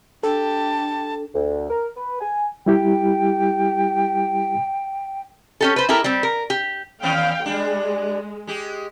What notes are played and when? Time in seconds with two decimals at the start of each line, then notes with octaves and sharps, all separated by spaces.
0.23 D4 G4 A4 A5
1.35 D2
1.70 A#4
1.96 B4
2.21 G#5
2.66 G3 E4 G4 G5
5.61 C#4 G4 A4
5.76 B4 C5
5.89 E4 G4 A4 A#4
6.04 G3 C4
6.23 A#4
6.50 G4
7.03 D#2 B3 C#4 F5 G5
7.46 G3 G#3 D4
8.47 G#3 G4